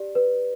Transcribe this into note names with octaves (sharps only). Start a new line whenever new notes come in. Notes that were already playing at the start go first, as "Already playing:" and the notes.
Already playing: G4 D5
B4